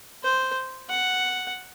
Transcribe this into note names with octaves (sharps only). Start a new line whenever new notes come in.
C5
F#5